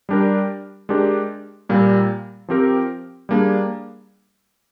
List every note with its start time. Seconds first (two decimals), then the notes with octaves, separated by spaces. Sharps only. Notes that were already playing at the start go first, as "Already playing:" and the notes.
0.09 G3 D4 G4 A#4
0.89 G#3 D4 G4 A#4
1.69 A#2 G3 A#3
2.48 F3 C4 G4 A#4
3.29 G3 A#3 D4 G#4